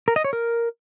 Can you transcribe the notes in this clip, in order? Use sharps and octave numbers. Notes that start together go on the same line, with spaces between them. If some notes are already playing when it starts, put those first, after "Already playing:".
A#4
D#5
C#5
A#4